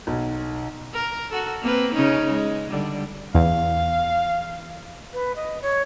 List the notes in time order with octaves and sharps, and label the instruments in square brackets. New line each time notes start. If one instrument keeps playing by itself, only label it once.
[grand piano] B1
[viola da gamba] A#4
F#4 A4
A#3 C4 B4
C#3 C#4 D#4
G#3
D3 G3
[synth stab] E2 [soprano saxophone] F5
[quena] B4
D#5
C#5